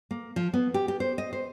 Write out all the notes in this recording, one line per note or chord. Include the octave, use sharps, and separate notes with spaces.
A#3
F3
B3
G4
G4
C5
D#5
C5